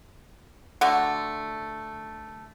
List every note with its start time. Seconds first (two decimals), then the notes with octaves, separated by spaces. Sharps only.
0.81 D3 A3 F#4